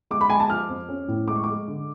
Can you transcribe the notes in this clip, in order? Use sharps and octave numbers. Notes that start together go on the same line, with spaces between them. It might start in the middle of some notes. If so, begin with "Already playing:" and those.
G#3 D6
B5
G#3 G#5
A5
F3 F6
F2
C#4
A2
G#3 D6
C#6
G#3 D6
D3